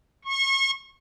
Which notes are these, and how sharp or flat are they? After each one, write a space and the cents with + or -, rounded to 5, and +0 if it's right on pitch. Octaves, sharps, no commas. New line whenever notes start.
C#6 -35